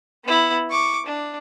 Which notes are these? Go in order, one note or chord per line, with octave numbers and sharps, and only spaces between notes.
B3 E4
C#6 D6
D4